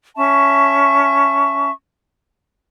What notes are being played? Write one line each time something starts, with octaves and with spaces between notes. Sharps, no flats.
C#4 E5 A5 C#6